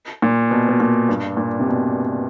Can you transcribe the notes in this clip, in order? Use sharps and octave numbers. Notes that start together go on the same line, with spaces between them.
A#2
B2
B2
A#2
G2
A#2
C3
B2